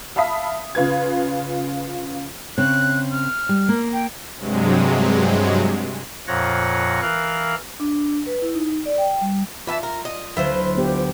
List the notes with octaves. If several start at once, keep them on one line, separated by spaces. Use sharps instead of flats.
E5 F5 A5 B5 D#6 B6
C#3 F4 B4 G#6
C#3 C4 C#5 F#6
F6
G3
A#3
G5
G2 C3 F#3 G#3
F2 A#2 F3 C#5 F#5 A#6
E3 A#4 F5 F#6
D4
B4
E4
D#4
D5
G5
G3
E3 F4 E5 A5
A#4
D#5
D2 F#3 E4 F4 B4 C5
B3 D4 G4